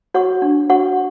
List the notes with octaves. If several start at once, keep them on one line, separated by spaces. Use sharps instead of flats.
F#4 C#5 F#5 C#6
D4
F#4 C#5 F#5 C#6